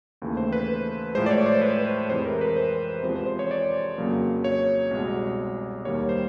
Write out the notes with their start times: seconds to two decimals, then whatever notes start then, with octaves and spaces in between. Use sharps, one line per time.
0.22 D#2 C#3 E3 A3
0.37 C5
0.52 B4
1.15 A2 F3 G#3 C5
1.26 D5
1.31 C#5
1.46 C5
1.62 B4
2.09 F2 C3 E3 G#3 C5
2.26 A#4
2.41 B4
2.56 C5
3.03 E2 C3 F3 G#3 C5
3.16 C5
3.26 C5
3.39 C#5
3.51 D5
3.98 F2 C#3 F#3 A#3
4.44 C#5
4.91 C2 B2 G#3
5.85 D#2 D#3 G3 A#3 C#5
6.09 C5